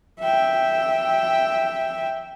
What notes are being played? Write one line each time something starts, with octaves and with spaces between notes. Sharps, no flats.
E5 G5